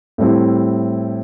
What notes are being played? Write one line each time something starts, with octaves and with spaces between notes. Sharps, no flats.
A2 G3 C4 E4